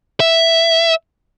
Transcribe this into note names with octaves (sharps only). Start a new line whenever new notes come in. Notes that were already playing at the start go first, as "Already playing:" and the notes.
E5